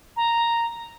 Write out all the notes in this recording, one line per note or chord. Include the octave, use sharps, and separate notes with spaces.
A#5